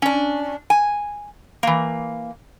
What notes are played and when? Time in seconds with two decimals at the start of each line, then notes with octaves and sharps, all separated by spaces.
0.02 C#4 D4
0.70 G#5
1.63 E3 A#3